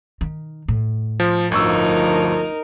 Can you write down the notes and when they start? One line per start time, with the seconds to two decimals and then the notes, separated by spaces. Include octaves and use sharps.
0.21 D#3
0.68 A2
1.20 F3
1.52 G1 D2 F3 D#4 A#4 C#6 E6